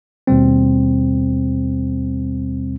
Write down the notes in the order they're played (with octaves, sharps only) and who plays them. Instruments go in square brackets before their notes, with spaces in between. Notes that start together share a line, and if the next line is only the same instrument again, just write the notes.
[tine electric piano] D#2 B2 G3 C4